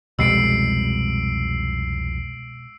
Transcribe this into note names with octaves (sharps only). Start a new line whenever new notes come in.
C2 F2 B2 G3 G#3 E6 C7 D7